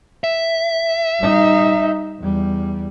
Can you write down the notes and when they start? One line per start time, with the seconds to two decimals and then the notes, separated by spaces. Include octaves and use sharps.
0.24 E5
1.20 G3 D#4
2.21 E2 G3